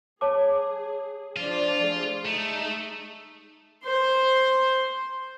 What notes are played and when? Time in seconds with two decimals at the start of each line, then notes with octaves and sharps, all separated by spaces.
0.21 G#4 C#5 A5 D6
1.36 F3 D4 F4 D5
1.84 A3 G#4
2.26 G#3 A3 D#4
3.85 C5 C6